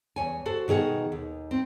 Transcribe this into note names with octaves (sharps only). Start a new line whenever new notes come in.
E2 C#5 G#5
F#4 A4 C5
B2 D#3 G#4 D#5 F#5
D#2
C4